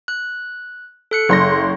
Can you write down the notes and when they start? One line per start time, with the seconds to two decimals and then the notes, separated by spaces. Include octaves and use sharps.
0.08 F#6
1.11 A4 F#6 C#7
1.29 F#1 C6 A#6